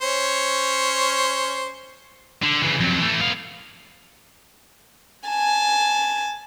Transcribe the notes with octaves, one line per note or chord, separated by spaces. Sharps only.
C#4 C5 C#5
D3
C#3 E3
F2 F#3
E3 A3
B3 F5
G#5 A5